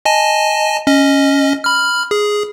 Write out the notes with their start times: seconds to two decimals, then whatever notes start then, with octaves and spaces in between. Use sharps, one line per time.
0.05 D#5 G#5 A5
0.86 C#4 D#5
1.64 B5 F6
2.11 G#4